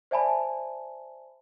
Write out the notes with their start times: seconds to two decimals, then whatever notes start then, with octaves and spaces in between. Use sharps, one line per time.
0.11 C5 D5 E5 G#5 A5 B5